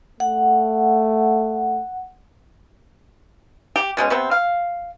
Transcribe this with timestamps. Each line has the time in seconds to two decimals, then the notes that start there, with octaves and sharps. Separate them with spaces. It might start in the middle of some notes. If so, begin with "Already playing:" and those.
0.20 A3 F#5
3.76 G4
3.97 B2 G#3 C4 C#4
4.10 C3 B3 C4
4.31 F5